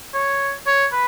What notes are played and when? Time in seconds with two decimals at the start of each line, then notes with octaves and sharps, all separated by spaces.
0.14 C#5
0.67 C#5
0.92 B4